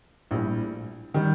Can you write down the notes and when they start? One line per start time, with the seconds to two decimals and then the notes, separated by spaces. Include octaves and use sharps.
0.31 A#1 A2 G3
1.14 D#3 G3